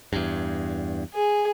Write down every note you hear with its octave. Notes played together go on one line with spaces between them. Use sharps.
E2 G2
G#4